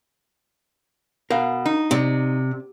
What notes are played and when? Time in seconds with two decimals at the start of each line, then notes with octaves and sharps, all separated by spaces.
1.30 B2 A#4 F5
1.66 D#4
1.91 C3 C4 D5